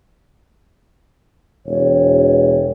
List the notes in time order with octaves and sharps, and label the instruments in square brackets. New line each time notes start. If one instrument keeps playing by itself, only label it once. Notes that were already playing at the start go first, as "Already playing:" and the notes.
[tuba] E1 [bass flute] C#5